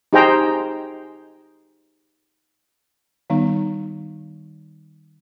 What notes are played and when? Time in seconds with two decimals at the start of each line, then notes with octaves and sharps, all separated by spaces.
0.13 D#4 G4 G#4 C5 G5 A#5
3.30 D#3 G3 B3 D#4